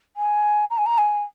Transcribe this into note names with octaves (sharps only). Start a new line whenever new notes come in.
G#5
A#5
G#5
A#5
G#5